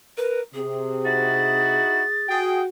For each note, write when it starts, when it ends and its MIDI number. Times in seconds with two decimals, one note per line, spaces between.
0.18 0.41 70
0.18 0.40 71
0.54 1.82 48
0.54 2.26 68
1.05 2.03 63
1.05 2.03 64
1.05 2.03 66
1.05 2.38 93
2.29 2.66 66
2.29 2.61 68
2.29 2.61 79